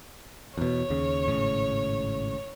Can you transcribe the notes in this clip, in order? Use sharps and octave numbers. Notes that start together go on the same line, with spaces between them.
E2 B2 C#5
D#2 C#3
G#1 A2 C#3